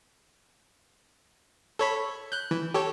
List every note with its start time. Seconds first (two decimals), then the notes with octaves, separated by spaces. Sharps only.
1.79 A4 C#5 B5
2.32 F#6 G6
2.51 E3
2.74 G4 A4 C#5